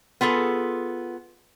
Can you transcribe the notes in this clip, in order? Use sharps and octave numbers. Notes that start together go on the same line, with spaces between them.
B3 F4 G#4 A4